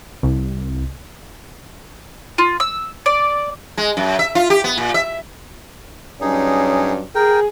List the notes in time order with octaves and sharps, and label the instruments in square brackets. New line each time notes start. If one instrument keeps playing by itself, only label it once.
[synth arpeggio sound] C2
[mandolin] F4
E6
D5
[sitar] G#3
F#2
E5
F4
G4
B3
A#2
E5
[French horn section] G2 F#3 C#4 [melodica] D#4 G#4
[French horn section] G#4 [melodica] A#4 G5